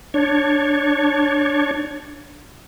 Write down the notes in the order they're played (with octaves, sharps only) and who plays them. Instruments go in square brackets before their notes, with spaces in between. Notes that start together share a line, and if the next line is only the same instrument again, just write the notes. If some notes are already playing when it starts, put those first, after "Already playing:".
[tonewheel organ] D4 C#5